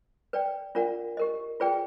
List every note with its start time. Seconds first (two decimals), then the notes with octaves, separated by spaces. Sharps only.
0.33 B4 D5 G5
0.75 D4 F4 A#4 D5 F#5
1.17 G4 A#4 D#5
1.60 F4 G#4 B4 D5 G5